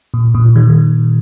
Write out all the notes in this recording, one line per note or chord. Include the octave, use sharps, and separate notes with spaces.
A#2
A#2
D#3